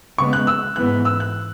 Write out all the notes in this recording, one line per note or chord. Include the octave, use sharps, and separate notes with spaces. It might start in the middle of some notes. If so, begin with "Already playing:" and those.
C#3 G#3 B3 C#6
F#6
E6
G#2 E3 B3 F#6
E6
F#6